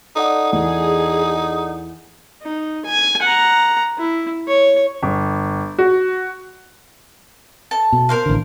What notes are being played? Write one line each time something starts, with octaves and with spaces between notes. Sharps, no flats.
D#4 A4 D5 F#5
E2 D#4 G#4
D#4
G#5
F#5 A#5
E4
C#5
G1
F#4
A4 A5
B2
A#4 C5 F5
A1 D3